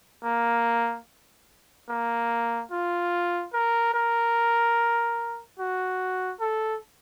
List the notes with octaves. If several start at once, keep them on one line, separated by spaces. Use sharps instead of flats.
A#3
A#3
F4
A#4
A#4
F#4
A4